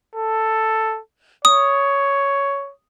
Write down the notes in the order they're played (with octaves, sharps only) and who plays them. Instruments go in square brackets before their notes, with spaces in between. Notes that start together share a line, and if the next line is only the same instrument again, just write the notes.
[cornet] A4
[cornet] C#5 [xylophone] D#6